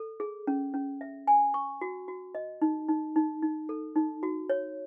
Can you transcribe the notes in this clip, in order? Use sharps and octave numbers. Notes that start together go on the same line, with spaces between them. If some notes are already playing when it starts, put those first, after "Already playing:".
Already playing: A4
G#4
C#4
C#4
E5
G#5
C#6
F#4
F#4
D#5
D#4
D#4
D#4
D#4
A4
D#4
F#4
C#5